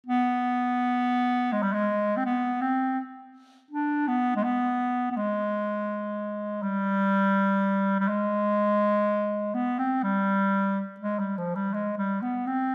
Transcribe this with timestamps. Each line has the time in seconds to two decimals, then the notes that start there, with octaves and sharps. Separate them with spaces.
0.07 B3
1.52 G#3
1.62 G3
1.73 G#3
2.17 C4
2.26 B3
2.61 C4
3.71 D4
4.08 B3
4.36 G#3
4.44 B3
5.11 B3
5.17 G#3
6.62 G3
8.00 G3
8.08 G#3
9.54 B3
9.79 C4
10.03 G3
11.00 G#3
11.19 G3
11.38 F3
11.55 G3
11.74 G#3
11.97 G3
12.22 B3
12.46 C4